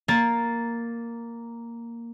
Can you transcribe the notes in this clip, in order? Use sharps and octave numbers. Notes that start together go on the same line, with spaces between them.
A#3 A6